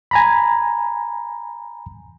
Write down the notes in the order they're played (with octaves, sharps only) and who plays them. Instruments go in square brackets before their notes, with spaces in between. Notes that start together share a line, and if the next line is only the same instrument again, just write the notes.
[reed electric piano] G#5 A#5 B5